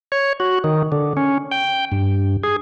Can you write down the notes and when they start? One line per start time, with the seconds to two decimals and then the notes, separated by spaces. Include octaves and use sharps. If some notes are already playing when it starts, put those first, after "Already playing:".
0.12 C#5
0.40 F#4
0.64 D#3
0.92 D3
1.17 C#4
1.51 G5
1.92 G2
2.43 G#4